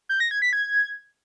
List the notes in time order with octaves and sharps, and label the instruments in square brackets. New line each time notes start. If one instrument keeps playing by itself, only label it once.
[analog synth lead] G6
A#6
G#6
B6
G#6